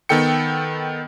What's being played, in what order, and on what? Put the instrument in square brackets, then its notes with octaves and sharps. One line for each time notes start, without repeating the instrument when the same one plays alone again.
[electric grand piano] D#3 B3 A4 G5 C#7